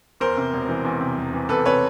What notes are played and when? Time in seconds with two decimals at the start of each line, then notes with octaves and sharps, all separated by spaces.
0.20 E2 A#4 C5
0.37 C3
0.53 E1
0.69 E3
0.85 E2
1.01 C3
1.18 E1
1.33 E3
1.49 E2 A4 B4
1.66 C3 B4 C#5